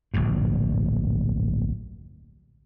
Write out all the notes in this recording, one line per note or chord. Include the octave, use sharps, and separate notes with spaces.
D1 A#1 G2